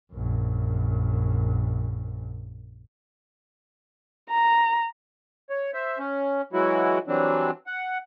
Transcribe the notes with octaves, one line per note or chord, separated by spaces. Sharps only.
A#1 F#2
A#5
C#5
C5 E5
C#4
E3 F#3 G#3 E4 F#4
E3 F#3 G3 C4 D4
F#5